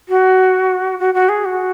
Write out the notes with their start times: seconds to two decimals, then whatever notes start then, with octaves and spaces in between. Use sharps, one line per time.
0.09 F#4
0.99 F#4
1.14 F#4
1.29 G#4
1.45 F#4